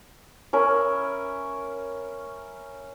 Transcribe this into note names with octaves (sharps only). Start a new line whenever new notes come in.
C#4 A#4 E5 B5